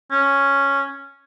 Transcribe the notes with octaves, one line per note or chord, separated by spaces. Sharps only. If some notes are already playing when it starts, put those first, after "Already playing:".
C#4